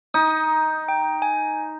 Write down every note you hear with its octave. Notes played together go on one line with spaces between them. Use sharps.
D#4 D#6
G5
G#5